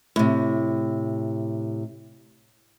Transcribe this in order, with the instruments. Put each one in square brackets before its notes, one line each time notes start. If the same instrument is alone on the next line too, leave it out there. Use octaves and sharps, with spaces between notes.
[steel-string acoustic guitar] A2 C3